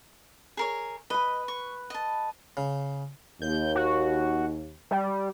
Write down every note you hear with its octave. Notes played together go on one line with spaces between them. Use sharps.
G#4 A#4 C#5
B4 D#5 B5
C#6
D#5 A5
C#3
D#2 G6
F#4
G3